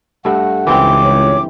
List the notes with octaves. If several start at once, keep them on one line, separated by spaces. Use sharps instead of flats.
G2 A3 F#5
C#2 E3 C4 D6
C#5